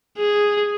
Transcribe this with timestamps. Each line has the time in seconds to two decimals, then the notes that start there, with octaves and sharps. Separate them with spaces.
0.18 G#4